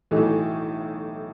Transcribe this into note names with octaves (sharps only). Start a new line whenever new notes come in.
B1 A2 E3 A3 D#4